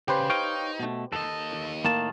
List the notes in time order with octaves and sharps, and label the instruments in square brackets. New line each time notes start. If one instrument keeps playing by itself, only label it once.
[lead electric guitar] C#3 [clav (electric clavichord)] G4 B4 C5
[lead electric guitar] D#4 [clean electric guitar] C#5 F5 G5
[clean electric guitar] B2 A3
[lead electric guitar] D#2 D#5 [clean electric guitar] A4
[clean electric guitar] A2 D#3 A5 [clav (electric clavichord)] A#3